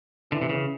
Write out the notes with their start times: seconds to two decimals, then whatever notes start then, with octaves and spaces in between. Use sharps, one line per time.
0.32 D3 E3
0.42 C3
0.49 C#3